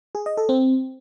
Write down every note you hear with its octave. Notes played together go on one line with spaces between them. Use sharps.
G#4
D#5
A4
C4